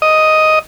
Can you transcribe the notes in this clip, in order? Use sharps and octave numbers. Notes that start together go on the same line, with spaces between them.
D#5